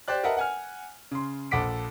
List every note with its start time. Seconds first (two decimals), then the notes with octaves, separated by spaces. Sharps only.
0.08 G4 C5 D5 F#6
0.24 A#4 B4 D#5 E5 F#5 A5
0.37 F#5 G#5 F6
1.11 C#3 C6
1.51 A#1 A4 F#5 D6 B6 D7